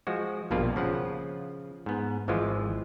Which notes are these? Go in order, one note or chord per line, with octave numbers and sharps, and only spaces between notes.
F3 G#3 F#4
A#1 G2 B2 A#3 F4 D5
C#3 F3 F#5
G#2 B3
G#1 E3 F3 G#3 F4